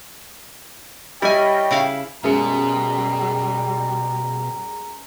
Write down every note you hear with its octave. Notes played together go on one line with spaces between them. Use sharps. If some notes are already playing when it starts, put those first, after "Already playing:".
G3 E4 C#5 D#5 G5 G#5
C#3 E4 F5
F#2 B2 G3 G#3 A#5 C#7